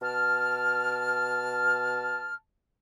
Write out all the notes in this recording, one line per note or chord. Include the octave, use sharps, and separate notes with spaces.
B2 A5 F6